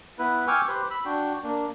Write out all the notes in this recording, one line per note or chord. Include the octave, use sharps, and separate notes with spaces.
B3 E4 B4
G5 G#5 C#6 D6 E6 F6
G4 B4 C5
B5 E6
D4 F#4 G5
A#3 D4